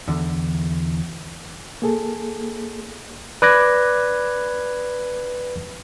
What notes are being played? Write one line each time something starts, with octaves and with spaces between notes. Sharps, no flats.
E2 D3
A#3 G#4 A4
B4 D5 D6 F#6 G#6 A#6